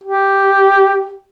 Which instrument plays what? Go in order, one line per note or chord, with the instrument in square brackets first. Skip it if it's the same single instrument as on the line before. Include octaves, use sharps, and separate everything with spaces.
[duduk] G4